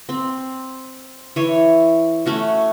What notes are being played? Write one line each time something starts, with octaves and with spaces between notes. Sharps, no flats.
C4
E3 C#5
A3 C#4 F#4